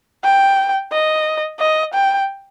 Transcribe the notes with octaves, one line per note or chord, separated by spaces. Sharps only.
G5
D#5
D#5
G5